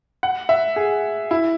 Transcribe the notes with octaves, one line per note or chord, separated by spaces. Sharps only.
F#5
E5
G#4
E4